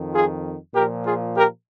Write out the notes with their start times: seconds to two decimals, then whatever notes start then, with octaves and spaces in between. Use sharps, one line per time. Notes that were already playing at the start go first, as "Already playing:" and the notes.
Already playing: F2 D#3
0.13 F4 G#4
0.74 A#2 F3 G4 A#4
1.05 F4 G#4
1.35 G4 A#4